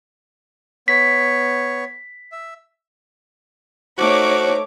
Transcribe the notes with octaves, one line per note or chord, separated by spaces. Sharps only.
B3 C#5 B6
E5
A3 D#4 F#4 C5 C#5 D6